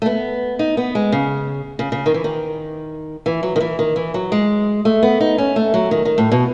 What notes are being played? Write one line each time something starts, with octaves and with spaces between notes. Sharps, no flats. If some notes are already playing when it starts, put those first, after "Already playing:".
A3
B3
D#4
B3
G#3
C#3
C#3
C#3
D#3
E3
D#3
E3
F#3
D#3
E3
D#3
E3
F#3
G#3
A3
B3
D#4
C#4
A3
F#3
D#3
D#3
A2
B2